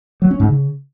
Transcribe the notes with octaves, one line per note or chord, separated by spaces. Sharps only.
F#3
C#4
G#2
C#3